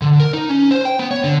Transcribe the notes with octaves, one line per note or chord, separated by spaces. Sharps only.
D3
A#4
D#4
C#4
C5
G5
B3
C#5
D3